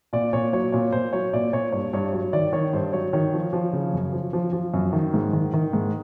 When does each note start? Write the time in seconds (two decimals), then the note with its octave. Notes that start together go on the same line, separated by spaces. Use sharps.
0.13 A#2 D5
0.33 A#2 C#5
0.53 F#3 C#5
0.72 A#2 C#5
0.92 A#2 C5
1.13 F#3 C#5
1.33 A#2 D5
1.53 A#2 C#5
1.72 G2 C#5
1.93 G2 C#5
2.13 F#3 C#5
2.33 D#3 D5
2.53 D#3 C#5
2.73 G2 C5
2.93 F#3 C#5
3.13 D#3 C#5
3.34 F3
3.53 F3
3.73 C#3
3.93 F#2
4.13 F3
4.33 F3
4.53 F3
4.74 F#2
4.93 D#3
5.14 G#2
5.33 D#3
5.53 D#3
5.73 G#2